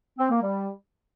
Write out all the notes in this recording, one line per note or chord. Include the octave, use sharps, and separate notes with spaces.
C4
A#3
G3